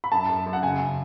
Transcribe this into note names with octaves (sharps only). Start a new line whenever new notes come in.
B5
F#2 A5
F#2
F#2
F#5
C#3 G#5
C#3